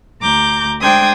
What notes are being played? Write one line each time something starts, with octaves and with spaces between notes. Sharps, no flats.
D2 A#5 D6 G6
G#3 D4 C5 G5 D#6 G#6